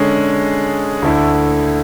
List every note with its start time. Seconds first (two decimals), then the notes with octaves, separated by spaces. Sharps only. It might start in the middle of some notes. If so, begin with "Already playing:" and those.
Already playing: D3 G#3 C#4 G#4
1.02 D2 D3 A3 E4